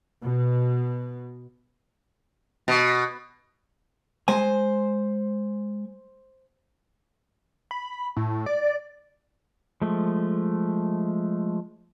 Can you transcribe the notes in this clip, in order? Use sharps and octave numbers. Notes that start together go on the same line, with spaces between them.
B2
B2
G#3 C5 G#5
B5
A2
D5
F3 G#3 A3